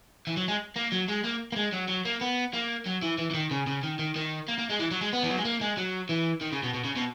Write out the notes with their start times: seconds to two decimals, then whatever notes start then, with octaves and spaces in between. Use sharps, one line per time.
0.27 E3
0.37 F#3
0.48 G#3
0.76 A#3
0.92 F#3
1.08 G#3
1.24 A#3
1.52 A#3
1.56 G#3
1.73 F#3
1.89 F#3
2.05 A#3
2.21 B3
2.53 A#3
2.86 F#3
3.02 E3
3.18 E3
3.31 E3
3.34 D#3
3.51 C#3
3.67 C#3
3.83 D#3
3.99 D#3
4.16 D#3
4.48 A#3
4.58 A#3
4.70 G#3
4.79 E3
4.91 F#3
5.01 G#3
5.13 B3
5.23 E3
5.30 F#3
5.37 G#3
5.45 A#3
5.61 G#3
5.78 F#3
6.09 E3
6.41 D#3
6.52 C#3
6.63 B2
6.74 B2
6.85 C#3
6.96 B2